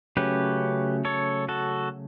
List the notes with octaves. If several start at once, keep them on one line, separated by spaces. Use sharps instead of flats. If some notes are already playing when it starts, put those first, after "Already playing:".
C#3 F#3 A3 C#4 G4 B4
A4 C#5
F#4 A4